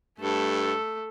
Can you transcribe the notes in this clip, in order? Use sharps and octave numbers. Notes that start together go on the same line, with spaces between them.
G2 A3 A4